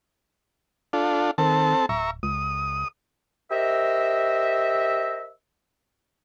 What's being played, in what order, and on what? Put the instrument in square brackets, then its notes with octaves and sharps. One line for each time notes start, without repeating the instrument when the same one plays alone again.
[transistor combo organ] D4 F4 A4
[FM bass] D#3 [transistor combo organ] C4 A4 A5
[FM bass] D1 [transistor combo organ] E5 A#5 C#6
[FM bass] C#2 [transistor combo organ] D#6
[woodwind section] G4 A#4 C5 D#5 E5